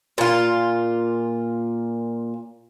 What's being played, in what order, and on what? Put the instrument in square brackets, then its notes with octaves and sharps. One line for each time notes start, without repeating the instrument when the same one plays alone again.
[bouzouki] A#2 F4